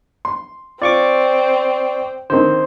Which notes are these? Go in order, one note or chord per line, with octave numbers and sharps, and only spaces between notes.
C6
C4 F4 D5 C#6 D6
D3 D#3 C4 C5